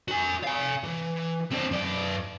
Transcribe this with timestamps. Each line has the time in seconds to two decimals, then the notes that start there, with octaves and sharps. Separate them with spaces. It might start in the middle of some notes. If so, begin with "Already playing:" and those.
0.08 F#4 G#5
0.44 F5 G#5
0.84 E3
1.52 C4 D4
1.71 F#2 D5